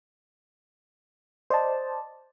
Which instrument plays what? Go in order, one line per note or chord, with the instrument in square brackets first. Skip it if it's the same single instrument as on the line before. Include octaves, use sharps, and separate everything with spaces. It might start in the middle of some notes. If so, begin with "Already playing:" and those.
[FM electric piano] C5 D5 D#5 A5